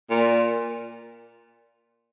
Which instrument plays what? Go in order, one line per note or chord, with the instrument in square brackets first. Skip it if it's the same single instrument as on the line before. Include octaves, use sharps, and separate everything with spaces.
[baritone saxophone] A#2